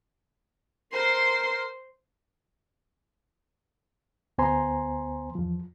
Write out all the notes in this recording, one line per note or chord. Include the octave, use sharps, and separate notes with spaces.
A#4 C5 C6
D2 B3 C5 G#5 A#5 C6
E2 F3